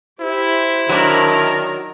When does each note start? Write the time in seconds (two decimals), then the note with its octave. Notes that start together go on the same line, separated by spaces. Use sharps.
0.21 E4 G4 C5
0.89 D#3 F#3 D4 A#4